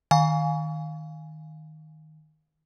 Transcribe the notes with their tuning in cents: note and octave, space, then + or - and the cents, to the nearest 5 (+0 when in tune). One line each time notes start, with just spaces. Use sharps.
D#3 +0 F5 +15 G#5 +0